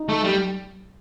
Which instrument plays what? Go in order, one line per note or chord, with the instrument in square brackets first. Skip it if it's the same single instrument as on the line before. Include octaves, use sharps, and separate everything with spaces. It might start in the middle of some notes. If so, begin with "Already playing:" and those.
Already playing: [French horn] D#4
[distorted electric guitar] A3
G3